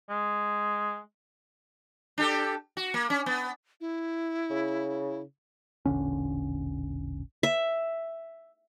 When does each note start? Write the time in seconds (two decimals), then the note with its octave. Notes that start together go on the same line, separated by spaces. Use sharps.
0.10 G#3
2.18 D4 G4 A4
2.77 F#4
2.94 A#3
3.10 C#4
3.26 B3
3.81 E4
4.51 C#3
5.86 E1 A#1 D3 C#4
7.43 E5